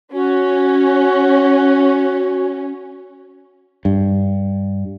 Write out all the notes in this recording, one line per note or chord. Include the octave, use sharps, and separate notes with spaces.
C#4 F#4
G2